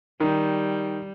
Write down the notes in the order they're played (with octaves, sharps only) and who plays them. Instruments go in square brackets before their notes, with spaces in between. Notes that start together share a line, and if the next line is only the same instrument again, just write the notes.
[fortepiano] D#3 [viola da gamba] G3